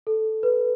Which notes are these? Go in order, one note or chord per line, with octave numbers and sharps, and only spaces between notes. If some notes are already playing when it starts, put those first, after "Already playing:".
A4
B4